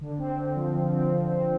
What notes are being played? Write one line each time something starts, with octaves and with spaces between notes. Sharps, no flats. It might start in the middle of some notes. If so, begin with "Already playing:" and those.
D3
C4
D3
F3
F3
C4
F3
C4